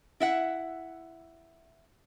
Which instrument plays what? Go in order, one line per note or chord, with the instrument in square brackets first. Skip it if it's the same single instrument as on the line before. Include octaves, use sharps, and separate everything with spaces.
[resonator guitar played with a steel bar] E4 E5 F#5